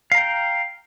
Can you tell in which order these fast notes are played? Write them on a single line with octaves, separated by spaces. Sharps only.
F5 A#5 G5